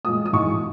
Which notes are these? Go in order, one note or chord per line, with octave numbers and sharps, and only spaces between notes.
A#2 G#3 D#6
D#6
G#2 E3 G#3 C#6